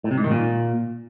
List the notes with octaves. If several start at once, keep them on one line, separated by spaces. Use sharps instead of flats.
A2
C3
G#2
D#3
A#2